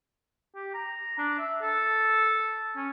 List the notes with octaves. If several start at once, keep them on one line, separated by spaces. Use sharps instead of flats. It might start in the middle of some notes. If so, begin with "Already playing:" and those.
G4
A#5
D4
E5
A4
C#4